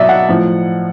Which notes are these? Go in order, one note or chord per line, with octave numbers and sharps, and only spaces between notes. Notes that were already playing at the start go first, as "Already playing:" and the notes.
Already playing: B2 F#3 D5 E5
F#5
A2 F3